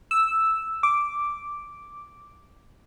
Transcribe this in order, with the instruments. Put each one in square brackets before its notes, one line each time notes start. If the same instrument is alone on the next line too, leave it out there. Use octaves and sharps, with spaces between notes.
[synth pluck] E6
D6